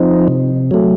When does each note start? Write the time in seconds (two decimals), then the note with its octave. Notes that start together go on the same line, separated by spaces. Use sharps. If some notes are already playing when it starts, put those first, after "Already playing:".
Already playing: F3 C4 D#4
0.28 C3
0.71 F#3 A3